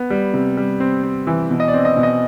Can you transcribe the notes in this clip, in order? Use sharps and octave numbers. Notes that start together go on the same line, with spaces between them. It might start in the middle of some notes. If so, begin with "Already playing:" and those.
Already playing: B3
G3
C3
G3
C4
C4
E3
B2
D#5
D5
C4
D#5
B2
D#5